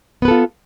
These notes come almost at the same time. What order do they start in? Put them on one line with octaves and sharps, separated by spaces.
B3 B4 A4 F4